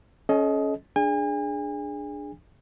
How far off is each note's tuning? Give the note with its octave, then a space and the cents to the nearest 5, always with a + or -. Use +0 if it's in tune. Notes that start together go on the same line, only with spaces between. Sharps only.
C#4 +0 A4 -45 D#5 +10
D4 +0 G#4 +0 G#5 -40